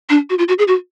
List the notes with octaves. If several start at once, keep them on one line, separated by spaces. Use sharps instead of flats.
D4
F#4
F4
F#4
G#4
F#4